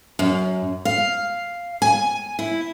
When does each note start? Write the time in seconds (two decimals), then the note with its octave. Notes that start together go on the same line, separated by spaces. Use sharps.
0.19 F#2
0.85 F5
1.82 G#5
2.39 E4